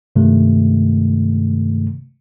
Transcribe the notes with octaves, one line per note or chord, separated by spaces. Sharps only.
G2 C3 D#3 G#3 A3